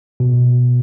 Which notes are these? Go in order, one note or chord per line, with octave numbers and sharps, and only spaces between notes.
B2